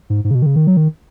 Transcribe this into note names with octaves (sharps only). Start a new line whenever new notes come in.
G#2
G#2
C#3
B2
D#3
C#3
D#3
F#3
D#3